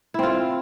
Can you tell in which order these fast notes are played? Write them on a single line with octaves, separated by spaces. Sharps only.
E4 C4 F4